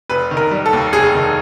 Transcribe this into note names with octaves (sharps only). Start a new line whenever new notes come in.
F1 B4
D#3
A#4
G3
A4
D#2
F1 G#4
D#3